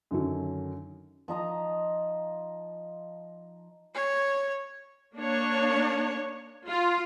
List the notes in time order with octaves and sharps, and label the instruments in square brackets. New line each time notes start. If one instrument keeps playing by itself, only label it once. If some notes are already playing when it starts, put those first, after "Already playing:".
[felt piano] F#2 D3 D#3 F#3
[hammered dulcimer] F3 D#4 D#5 A#5
[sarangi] C#5
[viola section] A#3 D4 C#5
F4